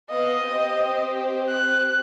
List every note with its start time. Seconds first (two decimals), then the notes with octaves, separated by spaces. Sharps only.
0.10 B3 D#5 F5
0.43 C4 G4 C5
1.49 F#6